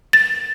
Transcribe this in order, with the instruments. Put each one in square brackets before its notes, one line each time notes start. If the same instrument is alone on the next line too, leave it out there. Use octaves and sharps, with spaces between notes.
[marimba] A6